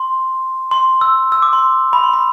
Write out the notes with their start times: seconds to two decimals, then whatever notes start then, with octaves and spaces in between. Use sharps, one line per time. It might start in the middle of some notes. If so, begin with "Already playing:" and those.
Already playing: C6
0.71 C6
1.01 E6
1.32 E6
1.42 D6
1.53 C6
1.93 B5
2.04 C6
2.13 B5